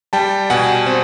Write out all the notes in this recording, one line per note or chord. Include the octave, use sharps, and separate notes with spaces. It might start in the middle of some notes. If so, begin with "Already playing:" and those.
G3 G5 A5
B2 F#5 G#5
C4